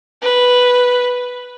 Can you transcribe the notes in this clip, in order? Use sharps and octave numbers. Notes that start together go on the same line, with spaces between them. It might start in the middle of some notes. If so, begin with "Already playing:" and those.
B4